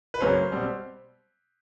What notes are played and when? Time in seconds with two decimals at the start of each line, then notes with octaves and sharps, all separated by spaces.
0.14 B4
0.21 F#2 C#3 F#3 A#3 C#4 C5
0.52 B2 G3 C4